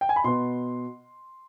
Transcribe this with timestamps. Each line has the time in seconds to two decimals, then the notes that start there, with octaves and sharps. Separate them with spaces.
0.01 G5
0.09 G#5
0.16 B5
0.24 B2 B3 C6